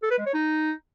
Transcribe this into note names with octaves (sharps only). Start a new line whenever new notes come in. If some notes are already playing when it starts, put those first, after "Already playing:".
A4
B4
G#3
C#5
D#4